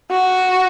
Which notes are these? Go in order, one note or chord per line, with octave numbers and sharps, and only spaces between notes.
F#4